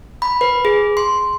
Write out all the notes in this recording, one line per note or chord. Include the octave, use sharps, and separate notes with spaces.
B5
B4
G#4
C6